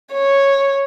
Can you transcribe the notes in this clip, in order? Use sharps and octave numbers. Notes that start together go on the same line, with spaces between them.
C#5